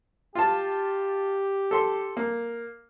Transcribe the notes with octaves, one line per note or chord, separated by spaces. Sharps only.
F4 G4 A5
A4 C6
A#3